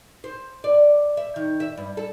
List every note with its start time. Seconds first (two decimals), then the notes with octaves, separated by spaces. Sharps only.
0.24 C5
0.64 D5
1.17 E5
1.36 D#3
1.60 E5
1.77 G2
1.97 A4